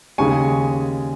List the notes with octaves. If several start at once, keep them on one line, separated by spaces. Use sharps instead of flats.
D#2 C#3 G#3 G#5 C#6